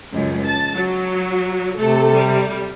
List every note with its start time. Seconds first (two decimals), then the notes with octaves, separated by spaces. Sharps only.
0.12 C#2 F#2
0.45 A5
0.75 F#3
1.78 C3 A3 A4
2.15 G3